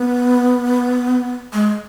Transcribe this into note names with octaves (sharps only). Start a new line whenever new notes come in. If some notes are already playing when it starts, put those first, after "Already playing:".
Already playing: B3
G#3